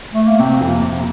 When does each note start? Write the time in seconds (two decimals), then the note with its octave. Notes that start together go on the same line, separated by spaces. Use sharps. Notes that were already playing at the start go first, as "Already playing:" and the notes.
0.14 A3
0.27 A#3
0.39 C3 C4
0.61 F2
0.67 A#3
0.82 C3
0.97 A#3